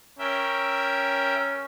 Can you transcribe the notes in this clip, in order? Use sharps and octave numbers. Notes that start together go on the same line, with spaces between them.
C#4 A#4 E5 G5